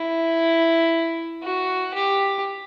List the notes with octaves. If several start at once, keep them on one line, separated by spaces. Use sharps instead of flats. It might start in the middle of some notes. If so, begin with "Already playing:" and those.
Already playing: E4
F#4
G4